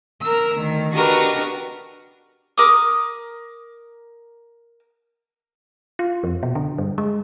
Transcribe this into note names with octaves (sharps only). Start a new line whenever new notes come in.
A#4 E6
D2 D#3
D4 F#4 G4 A#4 B4 D#5
A#4 D6 D#6
F4
F2
B2
D3
G2
G#3